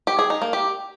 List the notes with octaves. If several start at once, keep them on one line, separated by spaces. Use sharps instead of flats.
G4
G#4
D#4
A#3
G4